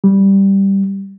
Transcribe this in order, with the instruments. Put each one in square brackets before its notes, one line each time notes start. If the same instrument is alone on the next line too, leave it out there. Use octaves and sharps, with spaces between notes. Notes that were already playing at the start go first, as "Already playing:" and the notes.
[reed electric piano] G3